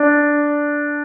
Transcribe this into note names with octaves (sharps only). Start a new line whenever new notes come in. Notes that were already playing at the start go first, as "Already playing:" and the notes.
Already playing: D4